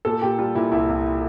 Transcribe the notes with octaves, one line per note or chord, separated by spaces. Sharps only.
A#2 A4
A#2 G4
G3 F4
A#2 E4
C2 E4
C2